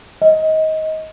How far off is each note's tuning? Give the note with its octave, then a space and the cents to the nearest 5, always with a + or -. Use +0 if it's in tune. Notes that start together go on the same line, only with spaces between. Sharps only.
D#5 +20